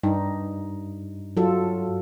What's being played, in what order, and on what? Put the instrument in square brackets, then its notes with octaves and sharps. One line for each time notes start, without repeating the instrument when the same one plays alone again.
[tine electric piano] G2 [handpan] D#4
[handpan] F#3 F4 A4